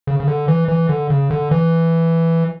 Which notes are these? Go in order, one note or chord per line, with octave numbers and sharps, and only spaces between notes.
C#3
C#3
D3
E3
E3
D3
C#3
D3
E3